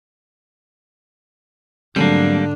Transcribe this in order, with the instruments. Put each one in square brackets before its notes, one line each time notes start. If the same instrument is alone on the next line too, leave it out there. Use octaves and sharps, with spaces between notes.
[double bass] G#2 D4 [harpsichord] D3 [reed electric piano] F#3 A3 C4 [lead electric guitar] G3 A#3